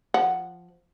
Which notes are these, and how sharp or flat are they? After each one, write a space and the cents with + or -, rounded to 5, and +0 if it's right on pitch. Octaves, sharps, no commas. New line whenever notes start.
F3 +0 F#5 +10